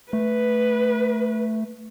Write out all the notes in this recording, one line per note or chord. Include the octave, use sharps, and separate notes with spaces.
A3 B4